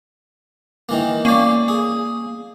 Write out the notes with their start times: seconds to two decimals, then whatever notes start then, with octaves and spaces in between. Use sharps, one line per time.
0.89 D#3 E3 A#3
1.25 A#3 C#4 D5
1.68 G#4